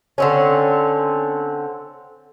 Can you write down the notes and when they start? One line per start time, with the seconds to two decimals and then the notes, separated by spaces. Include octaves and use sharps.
0.18 D3 C4 C#4